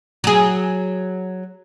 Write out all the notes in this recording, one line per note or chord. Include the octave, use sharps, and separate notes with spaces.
F#3 G#4